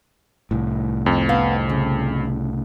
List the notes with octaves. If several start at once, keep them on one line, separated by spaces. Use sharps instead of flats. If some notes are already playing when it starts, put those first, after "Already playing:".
C2 A2
F2
B3 F5
C#3